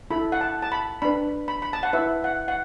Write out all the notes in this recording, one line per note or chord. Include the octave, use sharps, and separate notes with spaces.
E4 A4 B5
F#5
A5
A5
B5
D4 B4 B5
B5
B5
A5
F#5
E4 B4 E5
F#5
F#5